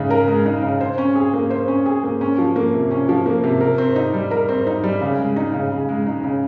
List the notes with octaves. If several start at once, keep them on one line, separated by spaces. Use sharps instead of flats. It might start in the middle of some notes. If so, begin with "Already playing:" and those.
Already playing: C#3 G#3 D#4
A#4
G#3
D#4
C#3
C5
C#4
G#4
A#3
C5
C#4
G#4
A#3
C#4
F3
A#3
C3
C#4
F3
A#3
C3
A#4
C4
D#4
G3
A#4
C4
D#4
G3
C#3
G#3
D#4
C#3
C#3
G#3
D#4
C#3